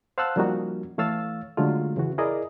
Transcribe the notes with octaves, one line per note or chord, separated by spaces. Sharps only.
C5 F5 F#5 A5 E6 F#6
F3 G3 A#3 C#4 D#4 F#4
E3 A3 C#5 F5 E6 A6
D3 F#3 G#3 A3 C#4 F4
C#3 E3 F#4
E4 G#4 A#4 D5 D#5